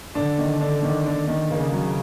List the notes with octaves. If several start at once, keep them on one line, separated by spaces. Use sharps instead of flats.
D3 D4
D#3
D4
D#3
D4
D#3
C#3 A#3
F#3